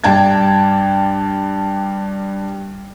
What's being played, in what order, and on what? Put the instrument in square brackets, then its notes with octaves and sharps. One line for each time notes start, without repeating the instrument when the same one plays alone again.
[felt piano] G2 D4 G5 A5 G#6